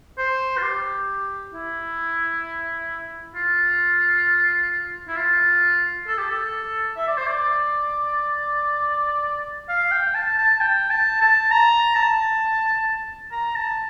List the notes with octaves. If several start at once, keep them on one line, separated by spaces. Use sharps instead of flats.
C5
F4
G4
E4
F4
E4
F4
A4
G4
A4
E5
D5
C5
D5
F5
G5
A5
A5
G5
A5
A5
A#5
A5
A#5
A5